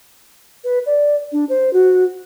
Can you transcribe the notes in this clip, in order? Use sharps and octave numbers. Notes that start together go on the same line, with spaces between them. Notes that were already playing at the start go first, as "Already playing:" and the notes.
B4
D5
D4
C5
F#4